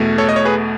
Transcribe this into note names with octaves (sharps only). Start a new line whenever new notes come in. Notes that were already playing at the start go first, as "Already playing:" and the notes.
Already playing: E2 B2 A3
A4 C#5
D#5
C#5
G#4 B4